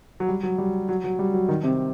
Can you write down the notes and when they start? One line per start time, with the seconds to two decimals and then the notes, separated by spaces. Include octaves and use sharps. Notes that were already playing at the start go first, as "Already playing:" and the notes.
0.20 F#3
0.29 G3
0.43 F#3
0.58 G3
0.89 F#3
1.04 F#3
1.19 G3
1.34 F#3
1.48 D#3
1.64 C3